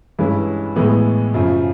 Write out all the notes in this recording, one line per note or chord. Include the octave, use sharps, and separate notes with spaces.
G2 E3 G#3 C#4 E4
A2 E3 G#3 B3
F#2 C#3 F3